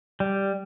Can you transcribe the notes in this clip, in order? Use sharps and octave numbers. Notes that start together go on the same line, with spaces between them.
G3